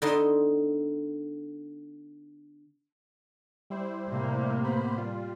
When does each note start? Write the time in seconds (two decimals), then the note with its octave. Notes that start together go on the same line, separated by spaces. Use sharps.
0.02 D3 B3 D#4 D#5 A5 C6
3.70 G3 E4 C5
4.07 A2 C3 A#3
4.64 B3 C5 B5
4.98 G3 F4